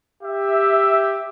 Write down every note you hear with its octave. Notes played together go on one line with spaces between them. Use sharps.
G4 E5